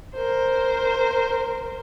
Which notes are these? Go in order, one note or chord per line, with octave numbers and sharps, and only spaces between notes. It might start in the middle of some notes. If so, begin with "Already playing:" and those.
A#4 C5